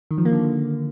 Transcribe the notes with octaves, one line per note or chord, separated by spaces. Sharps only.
D#3
F3
A#3
D3